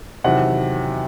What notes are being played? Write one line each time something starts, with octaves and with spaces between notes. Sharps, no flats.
E2 C3 D#3 F#3 F#5